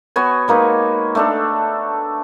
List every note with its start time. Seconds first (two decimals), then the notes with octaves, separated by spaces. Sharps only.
0.16 B3 F#4 C#5 G#5
0.48 G#3 A#3 D#4 B4
1.15 A3 D4 A4